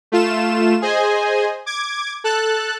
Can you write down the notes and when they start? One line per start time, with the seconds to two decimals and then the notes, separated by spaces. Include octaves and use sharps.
0.12 A3 F4 E7
0.82 G#4 C5 D#5 G#5
1.66 D6 G#6
2.24 A4 A5 F#6